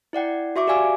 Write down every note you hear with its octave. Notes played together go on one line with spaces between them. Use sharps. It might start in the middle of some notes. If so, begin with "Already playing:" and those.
E4 D5 F#5 G5
F#4 E5 C#6 D6
G4 D5 F5 G#5 D6 E6